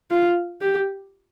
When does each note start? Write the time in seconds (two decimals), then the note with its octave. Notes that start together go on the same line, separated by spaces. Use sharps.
0.11 F4
0.61 G4